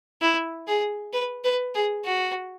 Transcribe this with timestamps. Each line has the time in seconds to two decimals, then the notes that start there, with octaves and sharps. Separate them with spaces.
0.22 E4
0.68 G#4
1.13 B4
1.45 B4
1.75 G#4
2.05 F#4